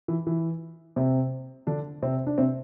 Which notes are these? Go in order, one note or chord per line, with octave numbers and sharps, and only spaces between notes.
E3
E3
C3 C4
D3 D4
C3 C4
D4
C3 C4